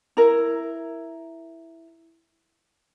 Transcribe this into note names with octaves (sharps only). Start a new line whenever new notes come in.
E4 A#4